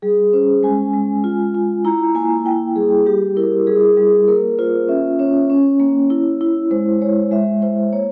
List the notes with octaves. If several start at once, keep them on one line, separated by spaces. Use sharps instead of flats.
G3 G#4
C#4 C5
G#3 G#5
G#3
F4
F4
E4 A#5
A#3 G#5
E4 G5
G3 G#4
G3 G4
E4 A#4
G3 G#4
G3 G#4
A#3 A#4
F4 C5
C#4 E5
C#4 C#5
C#4
A#3
E4
E4
G#3 C5
G#3 C#5
G#3 E5
E4 C5
A#3 C#5